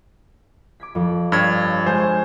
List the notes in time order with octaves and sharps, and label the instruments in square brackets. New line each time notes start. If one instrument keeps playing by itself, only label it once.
[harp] D6 G#6 B6
F2
[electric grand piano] G2 G#6 [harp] C#5 F6
[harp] G#3 G#5 G6 [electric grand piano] C5